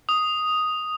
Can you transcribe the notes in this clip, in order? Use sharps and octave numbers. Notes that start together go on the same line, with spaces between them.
D#6